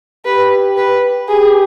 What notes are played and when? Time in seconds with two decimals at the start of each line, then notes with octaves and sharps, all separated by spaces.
0.25 G4 B4
0.77 B4
1.29 G4 G#4